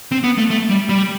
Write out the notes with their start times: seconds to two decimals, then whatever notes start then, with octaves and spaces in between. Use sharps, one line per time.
0.12 C4
0.24 B3
0.38 A3
0.50 A3
0.70 G3
0.89 G3